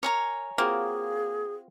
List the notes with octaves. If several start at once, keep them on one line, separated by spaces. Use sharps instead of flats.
A#4 C#5 G#5 A#5
A#3 C4 F4 F#4 G#4